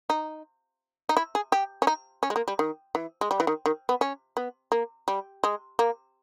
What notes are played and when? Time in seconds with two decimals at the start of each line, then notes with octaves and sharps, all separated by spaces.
0.10 D#4
1.09 D#4
1.17 E4
1.35 G#4
1.52 G4
1.82 C#4
1.87 D#4
2.23 C#4
2.30 G#3
2.36 A#3
2.48 G3
2.59 D#3
2.95 E3
3.21 G#3
3.31 G3
3.40 E3
3.47 D#3
3.66 D#3
3.89 B3
4.01 C#4
4.37 B3
4.72 A#3
5.08 G3
5.44 G#3
5.79 A#3